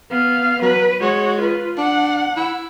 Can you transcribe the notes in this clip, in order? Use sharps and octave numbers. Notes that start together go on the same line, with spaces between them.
B3 F5
F#3 B4
G#3 F#4 C#5
F4 B4
D4 F#5
E4